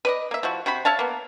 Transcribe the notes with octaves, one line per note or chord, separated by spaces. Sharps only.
B4 D5 D#5
A#3 E5
F3 E4 F#4
C3 F#4 C5 B5
C#5 E5 F5 A5
A#3 B3